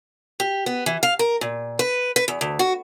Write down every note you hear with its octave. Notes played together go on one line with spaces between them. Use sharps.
G4
B3
E3
F5
A#4
A#2
B4
B4
E2
D2
F#4